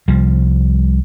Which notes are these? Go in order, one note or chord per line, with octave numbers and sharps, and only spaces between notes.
C2 F3 G3